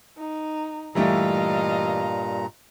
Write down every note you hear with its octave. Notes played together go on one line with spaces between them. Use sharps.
D#4
G2 A#2 E3 G3 A3 D#5 F5 A#5